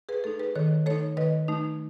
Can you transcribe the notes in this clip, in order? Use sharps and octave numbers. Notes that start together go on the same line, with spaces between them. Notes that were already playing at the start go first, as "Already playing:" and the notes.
G#4 B4
A3 D#4 A4
G#4 B4
D#3 A4 C#5
A3 D#4 A4 C#5
D#3 B4 D#5
A3 D#4